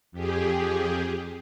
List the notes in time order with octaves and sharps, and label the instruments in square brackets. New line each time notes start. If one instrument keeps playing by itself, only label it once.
[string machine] F2 G4 G#4